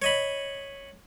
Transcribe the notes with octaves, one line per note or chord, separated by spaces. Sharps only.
C#5 D#5 B5